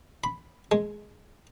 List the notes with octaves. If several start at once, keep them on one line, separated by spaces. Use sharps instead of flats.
B5
G#3